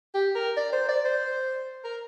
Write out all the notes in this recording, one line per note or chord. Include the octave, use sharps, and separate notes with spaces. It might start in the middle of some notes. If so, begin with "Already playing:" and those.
G4
A#4
D5
C5
D5
C5
A#4